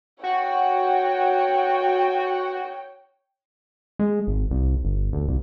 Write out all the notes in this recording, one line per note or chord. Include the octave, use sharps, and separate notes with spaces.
F#4 C#5 G5
G#3
G#1
C2
G1
D2
C2